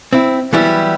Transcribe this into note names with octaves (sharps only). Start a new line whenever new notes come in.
C4 E4
E3 F#3 G3 B3 E4